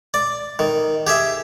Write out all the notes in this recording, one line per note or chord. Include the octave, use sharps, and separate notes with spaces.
D5
D#3
G4 G#4 E5